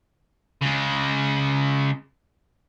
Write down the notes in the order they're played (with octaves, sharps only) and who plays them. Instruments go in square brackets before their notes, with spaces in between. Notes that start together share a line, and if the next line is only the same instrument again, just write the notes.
[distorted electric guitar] C#3 G#3